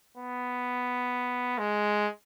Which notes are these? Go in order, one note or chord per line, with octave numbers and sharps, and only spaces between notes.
B3
G#3